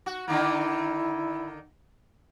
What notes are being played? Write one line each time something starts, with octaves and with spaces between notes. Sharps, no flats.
F#4
D3 D#3 A#3 E4